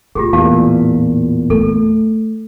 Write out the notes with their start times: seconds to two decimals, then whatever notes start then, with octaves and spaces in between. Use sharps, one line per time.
0.15 A2 F4 G4 G#4
0.33 E2 A#2 G4 F5 A5
1.50 A3 A4